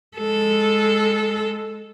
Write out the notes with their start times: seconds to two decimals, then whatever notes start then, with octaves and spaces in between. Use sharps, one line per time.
0.17 G#3 A4